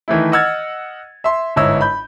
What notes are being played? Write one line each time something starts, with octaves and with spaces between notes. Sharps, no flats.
D#3 E3 A3 E4
D#5 F#5 E6 F6 G#6 A6
E5 C6
G1 G#2 E4 C#5 D#5 E6
B5 G6